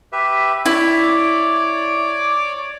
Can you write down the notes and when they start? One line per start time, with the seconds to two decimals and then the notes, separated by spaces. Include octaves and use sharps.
0.12 G4 B4 E5
0.66 E4 C#5 D5 D6